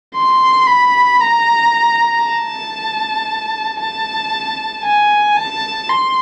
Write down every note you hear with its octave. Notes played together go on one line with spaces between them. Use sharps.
C6
B5
A#5
A5
A5
G#5
A5
C6